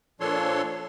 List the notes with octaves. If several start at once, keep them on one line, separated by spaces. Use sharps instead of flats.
A#2 F3 D4 A4 C#5 C6